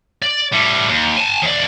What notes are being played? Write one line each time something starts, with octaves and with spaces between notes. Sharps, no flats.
D5
A2 G3
D#2
G#5 A5
D#2 D5